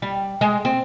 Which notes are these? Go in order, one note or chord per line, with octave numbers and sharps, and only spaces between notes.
G3
G#3
C4